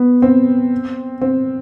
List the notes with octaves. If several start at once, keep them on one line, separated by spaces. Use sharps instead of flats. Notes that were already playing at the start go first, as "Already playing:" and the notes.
Already playing: B3
C4
C4